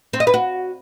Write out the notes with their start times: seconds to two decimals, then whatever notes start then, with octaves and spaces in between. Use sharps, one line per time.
0.13 C4
0.20 D#5
0.27 B4
0.34 F#4